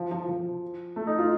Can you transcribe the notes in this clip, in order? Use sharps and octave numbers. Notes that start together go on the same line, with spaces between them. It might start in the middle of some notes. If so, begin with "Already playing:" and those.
Already playing: F3
F3
F3
A3
D#4
F4